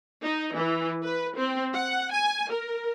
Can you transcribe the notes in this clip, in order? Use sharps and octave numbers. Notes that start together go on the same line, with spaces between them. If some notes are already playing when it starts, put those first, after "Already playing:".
D#4
E3
B4
C4
F#5
G#5
A#4